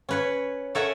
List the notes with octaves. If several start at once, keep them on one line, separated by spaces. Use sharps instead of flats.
C#4 B4 C#5
A4 A#4 C#5 E5 F#5 G#5